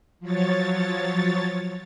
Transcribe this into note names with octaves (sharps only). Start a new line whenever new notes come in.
F3 F#3 C#5 A6